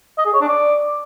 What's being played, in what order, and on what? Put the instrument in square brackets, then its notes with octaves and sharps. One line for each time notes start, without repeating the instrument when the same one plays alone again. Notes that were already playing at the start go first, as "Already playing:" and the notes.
[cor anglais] D#5
G#4
C#5
D4
D5